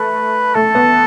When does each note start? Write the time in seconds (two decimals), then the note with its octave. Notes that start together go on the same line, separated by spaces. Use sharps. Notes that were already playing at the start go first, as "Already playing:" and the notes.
Already playing: A3 B4
0.55 A3 A4
0.75 B3